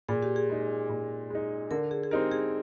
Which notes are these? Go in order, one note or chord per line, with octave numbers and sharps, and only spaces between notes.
A#2 G#4
G4
G#4
G#3 D#4
A#2
G#3 D#4
D3 A#4
G#4
G#4
G#3 C4 D#4 G4 A#4
G#4